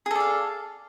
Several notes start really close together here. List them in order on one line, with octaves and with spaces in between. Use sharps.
G#4 A4 D5 F5